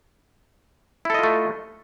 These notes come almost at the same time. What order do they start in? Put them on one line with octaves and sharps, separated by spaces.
E4 A4 D#5 F4 A3